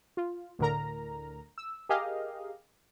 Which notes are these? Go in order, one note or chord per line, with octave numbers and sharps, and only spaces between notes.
F4
D2 A2 D3 A#4 A#5
E6
G4 G#4 A#4 D#5 F5